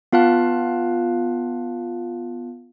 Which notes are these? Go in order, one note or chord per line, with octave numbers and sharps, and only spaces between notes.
B3 F4 F5 A5 F#6